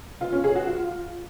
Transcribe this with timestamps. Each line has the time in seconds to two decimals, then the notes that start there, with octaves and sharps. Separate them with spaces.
0.21 F4
0.32 C#4
0.44 G#4
0.55 F#4
0.67 F4